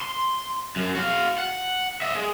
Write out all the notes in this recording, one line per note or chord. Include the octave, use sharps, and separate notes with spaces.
C6
F#2
F#4 F5
F#5
D#5 E5
G#3